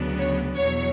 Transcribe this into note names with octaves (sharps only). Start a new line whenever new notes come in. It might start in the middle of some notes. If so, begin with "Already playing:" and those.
Already playing: D2 C#3 F#3 B3 D4
C#5
E2 B2 F#3 C#5